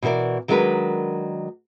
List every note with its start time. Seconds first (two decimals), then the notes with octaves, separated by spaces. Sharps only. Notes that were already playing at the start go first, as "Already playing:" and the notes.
0.03 B2 E3 F#4 A#4 D5
0.48 D#3 F#3 G#3 D4 A#4 B4